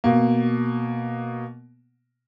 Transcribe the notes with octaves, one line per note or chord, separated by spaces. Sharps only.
B2 A#3